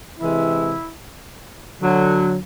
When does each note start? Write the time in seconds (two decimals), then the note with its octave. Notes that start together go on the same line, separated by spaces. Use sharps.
0.19 C3 E3 G#3 E4
1.81 D3 F#3